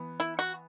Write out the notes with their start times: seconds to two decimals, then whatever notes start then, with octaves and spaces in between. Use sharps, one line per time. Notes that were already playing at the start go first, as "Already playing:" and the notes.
Already playing: E3 B3
0.20 E4
0.39 F#4